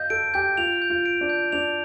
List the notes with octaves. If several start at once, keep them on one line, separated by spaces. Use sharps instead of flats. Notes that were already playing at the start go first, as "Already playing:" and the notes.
Already playing: D#5 F5 G6
A4 D7
G4 G6
F4 F7
G6
F4
D7
D4
G6
D4 F7